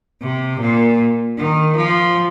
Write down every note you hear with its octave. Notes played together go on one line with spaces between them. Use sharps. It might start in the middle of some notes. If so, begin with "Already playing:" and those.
C3
A#2
D#3
F3